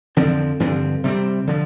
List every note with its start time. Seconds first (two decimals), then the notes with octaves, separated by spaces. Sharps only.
0.16 F2 D3 F3 C4
0.60 G2 D3 F3 C4
1.04 C3 G3 C4
1.47 D3 F3